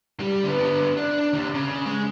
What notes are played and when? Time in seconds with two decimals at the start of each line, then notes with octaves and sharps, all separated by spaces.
0.20 G3
0.44 D3 B3
0.97 D4
1.33 D#2
1.55 C#3
1.86 G#3